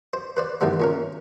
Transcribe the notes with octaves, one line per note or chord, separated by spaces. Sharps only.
C5
B4 C5 D5
G#2 D#3 E3 G3 B3
A#2 C#4 A#4